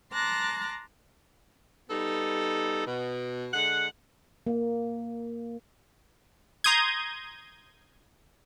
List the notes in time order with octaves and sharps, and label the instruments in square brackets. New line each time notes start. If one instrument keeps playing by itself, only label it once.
[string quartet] A5 A#5 C6 D6 F#6 A#6
[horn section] G3 B3 D#4 A4
B2
D3 G#3 F#5
[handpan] A#3
[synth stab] A#5 C6 D#6 G6 G#6